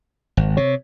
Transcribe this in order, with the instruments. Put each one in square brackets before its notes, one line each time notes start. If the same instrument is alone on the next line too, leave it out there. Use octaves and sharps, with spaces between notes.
[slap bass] G#1
[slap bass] C3 [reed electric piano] C#5